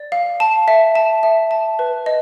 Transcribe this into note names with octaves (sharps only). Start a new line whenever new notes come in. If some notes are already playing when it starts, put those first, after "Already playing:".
Already playing: D5
F5
A5
E5
A5
E5
A5
B4
D#5